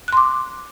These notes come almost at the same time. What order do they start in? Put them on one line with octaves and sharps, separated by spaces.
F#6 C6 D6